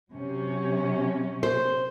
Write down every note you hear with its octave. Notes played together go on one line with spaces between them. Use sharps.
C3 F#3 C#4
C5